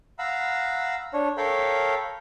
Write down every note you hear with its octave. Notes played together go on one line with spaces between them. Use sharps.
F5 F#5 A#5 B5 E6
D4 C#5
A4 A#4 C#5 F5 G5 B5